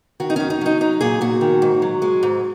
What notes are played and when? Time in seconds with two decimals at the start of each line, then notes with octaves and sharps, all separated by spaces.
0.20 D#3 F#4
0.30 D#4
0.36 F#2 C#4
0.50 D#4
0.61 F#3 D#4
0.81 F#3 D#4
1.01 A#2 G#4
1.21 A#2 F#4
1.41 D#3
1.62 G#2
1.82 F#3
2.02 G#3
2.23 G#2